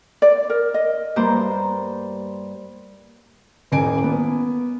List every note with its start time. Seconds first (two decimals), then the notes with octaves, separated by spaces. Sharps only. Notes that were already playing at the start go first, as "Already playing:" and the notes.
0.22 D5
0.50 A#4
0.74 D#5
1.16 G2 A#3 C5
3.72 D#1 A1 G#5 D7
4.03 A#3 B3